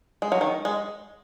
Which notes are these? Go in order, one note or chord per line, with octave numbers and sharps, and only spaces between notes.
G#3
F#3
D#3
G#3